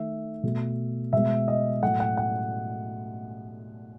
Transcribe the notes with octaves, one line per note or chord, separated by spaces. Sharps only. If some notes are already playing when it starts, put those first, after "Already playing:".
Already playing: D#3 A3 E5
B2 A3
B2 G#3 B3 E5
D#5
A2 F#3 A3 F#5
F#5
F#5